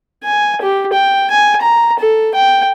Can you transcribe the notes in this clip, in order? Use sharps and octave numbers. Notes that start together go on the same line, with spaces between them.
G#5
G4
G5
G#5
A#5
A4
G5